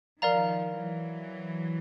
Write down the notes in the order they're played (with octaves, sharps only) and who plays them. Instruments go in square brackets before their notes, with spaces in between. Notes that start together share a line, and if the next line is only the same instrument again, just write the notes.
[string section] D#3 F3 [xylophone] A#4 D5 F5 A#5
[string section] E3 F#3